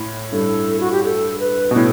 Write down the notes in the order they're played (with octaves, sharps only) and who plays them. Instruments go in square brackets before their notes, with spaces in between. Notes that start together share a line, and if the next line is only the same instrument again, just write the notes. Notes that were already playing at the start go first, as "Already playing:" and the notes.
Already playing: [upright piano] A2
[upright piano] G2 [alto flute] A4
[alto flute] F#4
G4
A4
B4
[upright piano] B2
[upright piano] A2 [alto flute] A4